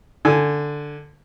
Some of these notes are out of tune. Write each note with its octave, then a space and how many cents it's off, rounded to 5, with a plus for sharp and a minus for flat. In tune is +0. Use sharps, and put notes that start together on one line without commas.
D3 +0 G#5 +0